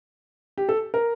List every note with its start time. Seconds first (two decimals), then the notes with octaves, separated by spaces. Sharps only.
0.58 G4
0.69 A4
0.94 A#4